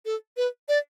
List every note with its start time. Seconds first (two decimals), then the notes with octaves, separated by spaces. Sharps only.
0.05 A4
0.37 B4
0.68 D5